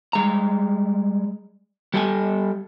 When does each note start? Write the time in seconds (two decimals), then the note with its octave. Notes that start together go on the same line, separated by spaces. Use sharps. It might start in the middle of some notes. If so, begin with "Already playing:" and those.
0.13 G3 G#3 A#5
1.94 G3 G4 A4 F#5 G#5